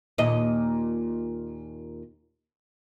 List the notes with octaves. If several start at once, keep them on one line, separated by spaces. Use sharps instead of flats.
D#2 A#2 D#5